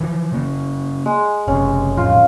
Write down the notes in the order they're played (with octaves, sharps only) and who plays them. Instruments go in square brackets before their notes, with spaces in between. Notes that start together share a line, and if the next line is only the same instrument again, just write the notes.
[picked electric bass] E3 F3
C#3 A#3
[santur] G#3
[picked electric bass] F#1 C3 [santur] C#4
[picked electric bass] D1 A1 F2 [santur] F4